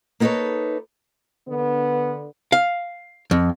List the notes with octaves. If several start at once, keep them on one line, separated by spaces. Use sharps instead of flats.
A#3 B3 D#4 A4 B4 C#5
D3 B3
F5
F2